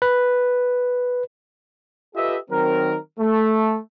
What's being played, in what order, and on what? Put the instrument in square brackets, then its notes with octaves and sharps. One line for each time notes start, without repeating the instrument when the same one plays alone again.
[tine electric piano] B4
[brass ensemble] F4 G4 A4 B4 D#5 E5
D#3 F#3 C4 A#4
A3